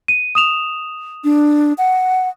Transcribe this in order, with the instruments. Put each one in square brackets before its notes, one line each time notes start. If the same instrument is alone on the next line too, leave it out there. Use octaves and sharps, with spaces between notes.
[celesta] D#7
D#6 E7 F7
[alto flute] D4
F#5